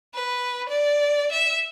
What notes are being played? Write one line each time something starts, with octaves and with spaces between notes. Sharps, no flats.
B4
D5
E5